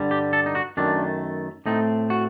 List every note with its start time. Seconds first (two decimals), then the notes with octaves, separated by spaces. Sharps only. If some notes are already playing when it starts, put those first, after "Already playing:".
Already playing: G2 D3 G3
0.11 G4
0.33 A4
0.46 D#4
0.55 F#4
0.77 F#2 D#3 A3 D4
1.66 A2 A3 C4 D#4
2.10 F#4